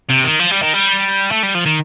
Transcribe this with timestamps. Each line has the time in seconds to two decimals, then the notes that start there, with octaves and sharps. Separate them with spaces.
0.09 C3
0.24 D#3
0.39 F3
0.51 G3
0.63 D#3
0.74 G3
1.32 A3
1.43 G3
1.55 F3
1.66 D#3